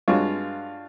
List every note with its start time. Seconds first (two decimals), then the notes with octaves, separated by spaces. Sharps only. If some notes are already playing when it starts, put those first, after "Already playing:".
0.08 G2 G#3 F4 F#4 C#5